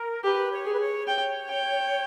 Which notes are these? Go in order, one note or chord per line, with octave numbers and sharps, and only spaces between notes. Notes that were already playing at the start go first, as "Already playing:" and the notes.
Already playing: A#4
G4 B4
C#5
G#4
B4
C#5
C#5 G5
G5